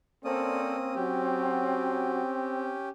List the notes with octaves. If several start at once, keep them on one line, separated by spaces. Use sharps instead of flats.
A#3 C4 C#4 A4 C5 D5 D#6
F#3 C#4 G4